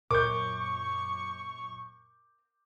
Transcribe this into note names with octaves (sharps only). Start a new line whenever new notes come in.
F#2 A#2 A#4 C5 C#6 D6 G6